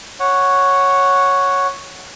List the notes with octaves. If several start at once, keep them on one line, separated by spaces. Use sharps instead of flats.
C#5 F#5